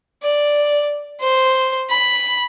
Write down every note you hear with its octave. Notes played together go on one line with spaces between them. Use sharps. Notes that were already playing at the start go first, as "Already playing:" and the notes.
D5
C5
B5